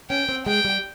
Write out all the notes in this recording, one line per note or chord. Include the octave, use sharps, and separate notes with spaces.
C#4 G5
C4
G#3 G5
G3